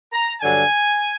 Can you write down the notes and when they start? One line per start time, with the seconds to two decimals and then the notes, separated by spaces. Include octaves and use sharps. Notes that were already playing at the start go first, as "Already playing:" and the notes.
0.13 A#5
0.41 G2 D3 F#3 G#5